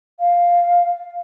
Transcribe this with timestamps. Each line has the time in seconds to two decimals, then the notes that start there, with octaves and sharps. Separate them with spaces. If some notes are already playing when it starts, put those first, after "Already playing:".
0.20 F5